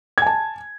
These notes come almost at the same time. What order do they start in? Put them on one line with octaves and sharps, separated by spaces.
G#6 G#5 A5